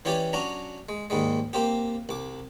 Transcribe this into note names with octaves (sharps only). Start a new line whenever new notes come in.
E3 C#4 G4 C#5 D5
F#3 C#4 D4 A#5
G#3
D#2 G#2 G3 G#3
A#3 C4 G4
C2 D6